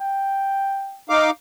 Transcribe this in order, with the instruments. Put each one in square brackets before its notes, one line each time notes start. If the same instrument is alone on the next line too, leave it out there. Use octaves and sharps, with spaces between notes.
[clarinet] G5
[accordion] D#4 F5 D6